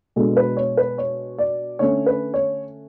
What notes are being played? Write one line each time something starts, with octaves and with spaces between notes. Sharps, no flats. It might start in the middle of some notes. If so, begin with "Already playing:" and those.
B2 G#3 B3 D4 A4
B4
C#5
B4
C#5
D5
D3 A3 C#4 C#5
B4
C#5